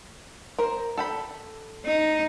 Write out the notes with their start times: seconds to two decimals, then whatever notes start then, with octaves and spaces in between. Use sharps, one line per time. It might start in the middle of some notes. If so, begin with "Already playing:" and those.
0.59 A#4 C5
0.97 A4 G5 B5
1.85 D#4